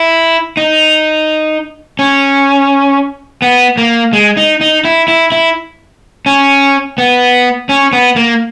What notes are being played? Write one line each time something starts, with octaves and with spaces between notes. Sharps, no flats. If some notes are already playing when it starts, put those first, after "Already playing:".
Already playing: E4
D#4
C#4
B3
A#3
G#3
D#4
D#4
E4
E4
E4
C#4
B3
C#4
B3
A#3